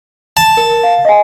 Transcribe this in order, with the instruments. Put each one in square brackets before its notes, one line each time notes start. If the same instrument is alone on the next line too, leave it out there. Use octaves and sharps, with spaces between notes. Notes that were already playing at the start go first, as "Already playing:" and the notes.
[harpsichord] A5
[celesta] A#4
F5
D#5 G#5